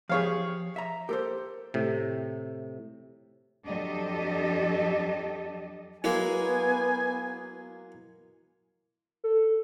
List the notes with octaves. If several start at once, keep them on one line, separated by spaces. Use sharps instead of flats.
F3 G4 G#4 C#5 F5
E5 A#5
A#3 G4 A4 C5
A2 C3
F2 F#3 D4 G4 A4 D#5
F#3 G#3 A#3 B3 E4 G#5
A4